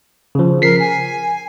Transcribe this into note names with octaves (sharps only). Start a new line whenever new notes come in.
C#3 F3
A#4 B6 C7
G#5